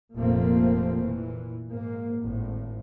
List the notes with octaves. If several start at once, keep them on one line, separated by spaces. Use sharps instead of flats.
F1 A#2 F3 A3 A#3 C4
A#2 E3
G#2 A#3
G#1 A2